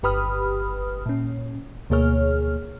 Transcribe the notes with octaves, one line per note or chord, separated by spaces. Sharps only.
G1 G4 B4 B5 D#6 F6
A#2 C#4
D2 B2 A#3 G#4 C#5 F6